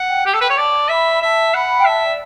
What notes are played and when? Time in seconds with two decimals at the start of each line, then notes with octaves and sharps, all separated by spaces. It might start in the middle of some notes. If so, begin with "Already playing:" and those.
Already playing: F#5
0.09 G5
0.26 G4 G5
0.34 A4
0.41 B4 G5
0.50 C#5
0.57 D5 A5
0.89 E5 B5
1.21 E5 A5
1.54 F#5 B5
1.77 G5
1.85 E5 A5
2.02 D5